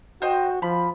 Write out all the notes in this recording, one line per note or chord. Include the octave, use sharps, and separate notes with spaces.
F#4 C5 D#5 G5
F3 B5